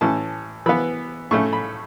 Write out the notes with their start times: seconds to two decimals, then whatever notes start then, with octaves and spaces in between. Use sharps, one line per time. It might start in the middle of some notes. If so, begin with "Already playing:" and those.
0.01 A2 E3 C#4 A5
0.66 E3 B3 B5
1.31 A2 A3 C#4 C#6
1.53 B5